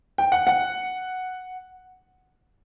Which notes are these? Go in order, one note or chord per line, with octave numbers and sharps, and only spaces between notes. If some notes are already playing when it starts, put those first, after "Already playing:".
G5
F#5
F#5